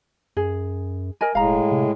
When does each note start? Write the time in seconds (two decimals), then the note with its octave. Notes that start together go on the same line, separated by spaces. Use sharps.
0.37 F#2 G#4
1.21 A#4 D#5 G#5
1.35 E1 A2 G#3 F5 A#5
1.72 C3